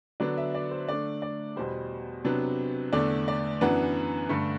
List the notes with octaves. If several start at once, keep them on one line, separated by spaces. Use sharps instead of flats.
D3 F#3 B3 D4 D5
E5
D5
C5
D3 A3 D4 D5
D5
E2 B2 G3 C5
C3 F#3 B3 D4
E2 D3 A3 D4 D5
D5
F#2 E3 B3 D4 F#5
G2 D3 A3